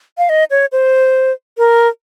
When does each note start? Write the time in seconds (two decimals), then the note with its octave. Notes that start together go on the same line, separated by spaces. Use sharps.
0.18 F5
0.29 D#5
0.51 C#5
0.72 C5
1.58 A#4